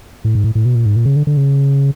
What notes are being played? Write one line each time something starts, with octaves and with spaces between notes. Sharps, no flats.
A2
G#2
A2
A2
B2
A#2
G#2
A#2
C#3
D3
D3
C#3